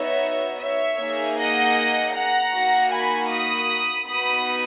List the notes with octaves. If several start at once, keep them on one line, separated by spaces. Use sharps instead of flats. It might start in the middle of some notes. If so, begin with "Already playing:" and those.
Already playing: B3 D#4 F#4 C#5 E5
C#5 E5
A#3 D#4 G#4
D#5 F#5
F#5 A#5
A#3 D#4 F#4
G#5 B5
B5 D#6
B3 D#4 F#4 B5 D#6